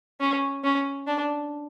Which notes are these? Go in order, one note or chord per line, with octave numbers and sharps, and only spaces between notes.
C#4
C#4
D4